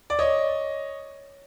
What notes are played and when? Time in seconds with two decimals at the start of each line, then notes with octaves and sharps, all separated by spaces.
0.10 D5
0.19 C#5 D#5